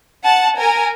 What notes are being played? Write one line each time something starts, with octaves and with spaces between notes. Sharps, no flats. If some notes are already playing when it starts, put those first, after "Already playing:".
F#5 A5
A#4 G#5